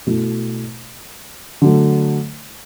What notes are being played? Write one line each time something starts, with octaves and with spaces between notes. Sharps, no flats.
B2 A3 E4
D3 F#3 A3